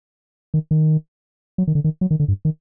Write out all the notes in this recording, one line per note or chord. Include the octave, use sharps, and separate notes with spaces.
D#3
D#3
F#3
D#3
D3
D#3
F#3
D#3
D3
G2
D#3